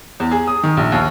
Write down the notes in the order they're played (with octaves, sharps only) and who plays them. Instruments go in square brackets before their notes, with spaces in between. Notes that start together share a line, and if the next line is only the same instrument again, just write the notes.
[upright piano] E2
G#4
D#6
D#3
A#1
D#2